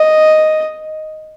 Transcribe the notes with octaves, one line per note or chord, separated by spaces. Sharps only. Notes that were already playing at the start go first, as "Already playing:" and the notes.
Already playing: D#5